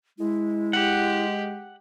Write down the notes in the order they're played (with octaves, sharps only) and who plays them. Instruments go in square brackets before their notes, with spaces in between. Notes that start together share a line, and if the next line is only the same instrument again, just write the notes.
[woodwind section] G#3 [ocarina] E4
[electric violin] G4 [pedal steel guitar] F#5